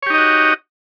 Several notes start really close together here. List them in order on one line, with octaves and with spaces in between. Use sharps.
C#5 G4 D#4 D#5 F#4